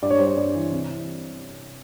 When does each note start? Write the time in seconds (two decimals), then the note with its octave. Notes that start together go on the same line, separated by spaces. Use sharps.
0.02 G2 D5
0.11 C#5
0.19 G3 C5
0.27 C#5
0.37 G2 D5
0.55 E3
0.72 C2
0.89 E3